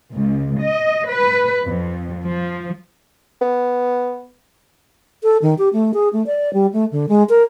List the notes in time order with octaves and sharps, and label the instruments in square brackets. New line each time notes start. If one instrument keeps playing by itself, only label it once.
[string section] C#2
D#5
B4
F2
F3
[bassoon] B3
[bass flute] A4
D#3
G4
A3
G#4
A3
D5
G3
A3
D3
G#3
A#4